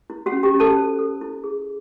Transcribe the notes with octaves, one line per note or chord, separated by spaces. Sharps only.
E4
F#4 F#5
C#4
G4 G5
C#4
A4 A5
C5
A4
E4
G#4